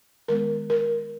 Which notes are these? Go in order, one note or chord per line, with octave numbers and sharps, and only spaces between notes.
D#3 G#3 B3 A#4
A#4